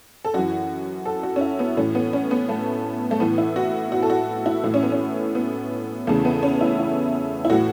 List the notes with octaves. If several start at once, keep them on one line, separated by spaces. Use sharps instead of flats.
A4
F#2 E3 F#4
A4
F#4
C#4
E4
B3
A2 E3 C#4
B3
C#4
B3
A3
A3
A2 E3 B3
E4
F#4
F#4
A4
F#4
E4
A2 E3 E4
C#4
B3
C#4
B3
E2 C#3 E3 A3
B3
C#4
E4
E4
E4
A2 E3 F#4